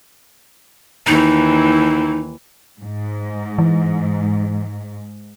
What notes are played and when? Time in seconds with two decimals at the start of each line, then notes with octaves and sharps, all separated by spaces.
1.07 D#2 E3 D#4
2.80 G#2
3.58 E3